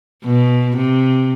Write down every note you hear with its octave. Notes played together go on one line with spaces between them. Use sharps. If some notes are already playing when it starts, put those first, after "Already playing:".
B2
C3